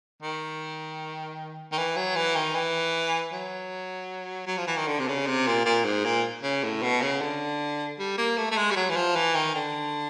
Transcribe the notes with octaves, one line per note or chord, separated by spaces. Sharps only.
D#3
D#3
E3
F#3
E3
D#3
E3
F#3
F#3
F3
E3
D#3
D3
C3
C#3
C3
A#2
A#2
G#2
A#2
C#3
A2
B2
C#3
D3
G3
A#3
A3
A3
G#3
G3
F#3
E3
F3
E3
D#3
D3